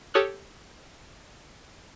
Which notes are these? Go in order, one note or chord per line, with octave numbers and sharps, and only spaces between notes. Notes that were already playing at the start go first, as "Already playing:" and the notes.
G4 A4 C#5 D#6 F6 F#6